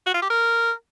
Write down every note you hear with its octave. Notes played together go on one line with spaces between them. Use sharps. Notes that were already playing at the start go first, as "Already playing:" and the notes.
F#4
F4
G4
A#4